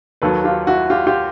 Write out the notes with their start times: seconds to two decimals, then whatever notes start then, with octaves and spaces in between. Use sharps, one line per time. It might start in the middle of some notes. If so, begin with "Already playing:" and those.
0.22 D#2 D#3 F#3 A4 B4
0.44 F4 G4
0.67 E4 F#4
0.90 F4 G4
1.07 F4 G4